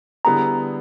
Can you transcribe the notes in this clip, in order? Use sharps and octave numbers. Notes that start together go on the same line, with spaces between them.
D3 G3 B3 E4 G#4 A#5